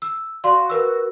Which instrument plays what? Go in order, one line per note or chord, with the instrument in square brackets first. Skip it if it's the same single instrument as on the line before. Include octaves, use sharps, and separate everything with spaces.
[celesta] E6
[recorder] F#4 [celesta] D5 F5 C6
[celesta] A#4 B4 E6